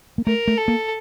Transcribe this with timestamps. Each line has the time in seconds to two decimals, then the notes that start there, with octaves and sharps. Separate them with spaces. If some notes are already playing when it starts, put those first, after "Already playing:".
0.18 A#3
0.26 A3 A#4
0.48 A3
0.58 A4
0.68 A#3